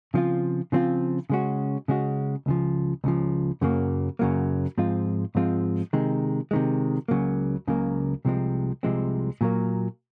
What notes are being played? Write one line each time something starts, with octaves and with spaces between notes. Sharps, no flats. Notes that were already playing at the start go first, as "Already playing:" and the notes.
C#3 F3 C4 F4
C#3 F3 C4 F4
C#3 G#3 C#4 F#4
C#3 G#3 C#4 F#4
C#2 C#3 F3
C#2 C#3 F3
F#2 C#3 F#3 A#3
F#2 C#3 F#3 A#3
G#2 F3 G#3 C4 F4
G#2 F3 G#3 C4 F4
C3 D#3 G#3
C3 D#3 G#3
C#2 C#3 F#3 A#3
C#2 C#3 F#3 A#3
C2 C3 F3 G#3 C4
C2 C3 F3 G#3 C4
A#2 F#3 A#3